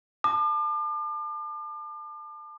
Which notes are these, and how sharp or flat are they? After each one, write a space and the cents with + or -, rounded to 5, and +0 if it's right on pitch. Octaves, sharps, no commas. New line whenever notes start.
A5 +0 D6 +40